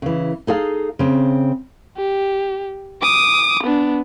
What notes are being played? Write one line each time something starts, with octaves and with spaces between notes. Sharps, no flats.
C#3 E3
D#4 G#4 A4 F5
C#3 C4
G4
D6 D#6
B3 D4